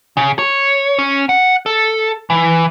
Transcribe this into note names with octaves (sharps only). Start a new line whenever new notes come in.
C#3
C#5
C#4
F#5
A4
E3